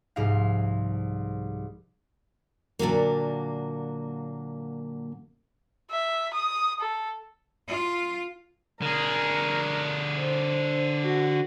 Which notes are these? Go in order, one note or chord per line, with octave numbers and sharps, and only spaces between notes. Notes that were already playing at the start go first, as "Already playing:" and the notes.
C2 G#2 F3 F5
A#2 D3 F#3 A#3
E5
D#6
A4
F4
D3 G#4 A#4
C5
F#4